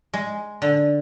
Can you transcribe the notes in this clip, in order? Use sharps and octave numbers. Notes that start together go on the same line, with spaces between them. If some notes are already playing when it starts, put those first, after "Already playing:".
G#3
D3